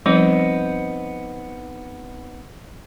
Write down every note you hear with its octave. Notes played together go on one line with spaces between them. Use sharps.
F3 G3 B3 C4 D#4